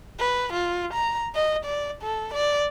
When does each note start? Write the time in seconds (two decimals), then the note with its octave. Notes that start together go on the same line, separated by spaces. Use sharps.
0.20 B4
0.53 F4
0.94 A#5
1.35 D#5
1.65 D5
2.03 A4
2.34 D5